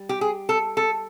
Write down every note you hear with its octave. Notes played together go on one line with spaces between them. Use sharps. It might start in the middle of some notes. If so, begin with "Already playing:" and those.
Already playing: G3
G4
G#4
A4
A4